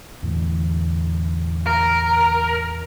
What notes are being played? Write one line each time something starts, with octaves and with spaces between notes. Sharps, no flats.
E2 A2 D3
A#4